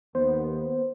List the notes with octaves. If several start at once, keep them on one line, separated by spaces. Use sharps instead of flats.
D#2 B3 C5